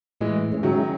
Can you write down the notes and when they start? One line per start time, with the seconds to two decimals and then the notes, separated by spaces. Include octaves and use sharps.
0.21 A2 E3 G#3
0.52 G#3 C#4 E4
0.63 D#3 F#3